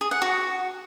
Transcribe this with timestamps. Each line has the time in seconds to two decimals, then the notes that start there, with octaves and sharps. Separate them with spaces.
0.01 G#4
0.11 F#5
0.22 F#4